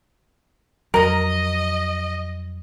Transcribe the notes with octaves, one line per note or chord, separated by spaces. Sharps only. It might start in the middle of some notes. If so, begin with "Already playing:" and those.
F2 F#3 A#4 D#5 A#5